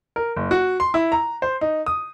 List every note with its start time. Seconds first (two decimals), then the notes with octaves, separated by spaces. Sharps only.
0.16 A#4
0.36 F#1
0.51 F#4
0.80 C6
0.94 E4
1.12 A#5
1.42 C5
1.61 D#4
1.86 D#6